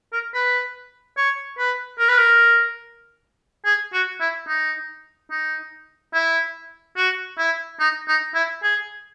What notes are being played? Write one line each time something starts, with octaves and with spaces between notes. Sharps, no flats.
A#4
B4
C#5
B4
A#4
B4
A#4
G#4
F#4
E4
D#4
D#4
E4
F#4
E4
D#4
D#4
E4
G#4